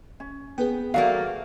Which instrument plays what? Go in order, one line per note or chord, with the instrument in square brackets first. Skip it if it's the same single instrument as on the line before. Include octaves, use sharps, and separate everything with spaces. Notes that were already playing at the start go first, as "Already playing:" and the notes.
[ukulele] C#4
[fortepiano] B3 [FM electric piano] G#4 B4 G5
[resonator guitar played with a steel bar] F#3 A3 A#3 [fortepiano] F#4 D5 [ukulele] F5